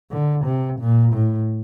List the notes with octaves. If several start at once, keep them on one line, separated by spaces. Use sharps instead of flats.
D3
C3
A#2
A2